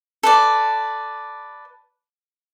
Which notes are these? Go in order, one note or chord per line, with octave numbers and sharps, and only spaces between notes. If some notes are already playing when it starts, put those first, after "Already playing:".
A4 B4 D5